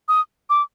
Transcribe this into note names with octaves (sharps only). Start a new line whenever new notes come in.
D#6
D6